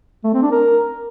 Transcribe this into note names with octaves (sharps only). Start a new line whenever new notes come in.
A3
C4
D4
A#4